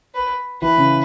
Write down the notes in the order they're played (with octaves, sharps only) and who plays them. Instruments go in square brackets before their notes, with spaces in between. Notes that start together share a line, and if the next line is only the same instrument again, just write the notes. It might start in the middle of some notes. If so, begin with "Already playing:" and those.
[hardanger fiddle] B4
[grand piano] E3 [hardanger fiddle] B4
[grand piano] C#3